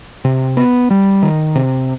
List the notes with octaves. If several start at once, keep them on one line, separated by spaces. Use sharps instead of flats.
C3
B3
G3
D#3
C3